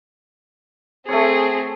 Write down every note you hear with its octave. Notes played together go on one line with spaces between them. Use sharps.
A3 C4 G#4 A4 C#5